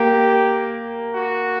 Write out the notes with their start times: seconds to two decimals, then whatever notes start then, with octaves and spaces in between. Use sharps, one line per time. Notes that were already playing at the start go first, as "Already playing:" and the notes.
Already playing: A#3 G4
1.14 F#4